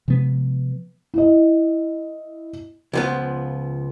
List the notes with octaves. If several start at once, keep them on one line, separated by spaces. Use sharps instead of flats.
C3 F3 G#3 B3
E4 D#5
C#2 F3 B3